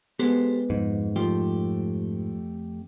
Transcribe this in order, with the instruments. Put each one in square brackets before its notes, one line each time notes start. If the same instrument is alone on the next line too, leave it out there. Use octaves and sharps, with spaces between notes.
[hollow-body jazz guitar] G#3 B3 [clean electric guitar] G4 A4 C5
[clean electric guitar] F2 [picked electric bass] G#2
[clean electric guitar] F2 A3 G4 [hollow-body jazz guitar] F3